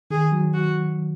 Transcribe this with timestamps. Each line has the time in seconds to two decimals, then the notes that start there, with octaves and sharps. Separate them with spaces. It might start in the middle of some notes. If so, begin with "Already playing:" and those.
0.11 D#3 G#4
0.32 F#3
0.54 F#4